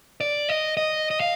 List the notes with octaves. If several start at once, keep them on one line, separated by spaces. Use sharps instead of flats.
D5
D#5
D#5
D#5
F5